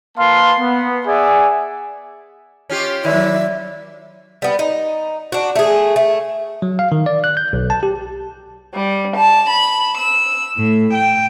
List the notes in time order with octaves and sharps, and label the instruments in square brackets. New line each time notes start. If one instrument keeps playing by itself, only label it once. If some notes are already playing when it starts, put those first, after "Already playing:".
[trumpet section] A#3 B4 F5 A5 C6
B3
G#4 D5 E5 F#5 G#5
[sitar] C#4 F4 G4
[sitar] D#3 [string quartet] F#3 E5 [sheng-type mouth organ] E4 [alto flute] D5
[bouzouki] G3 B3
D#4
D4 F#4
A3 G#4
A3
[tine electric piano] F#3
F5
D#3
D5
F#6
G6
B1
A5
G4
[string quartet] G3
A5
B5
E6
A2
G5